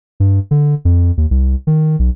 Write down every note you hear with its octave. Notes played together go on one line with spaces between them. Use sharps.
G2
D3
F2
D#2
C2
D#3
B1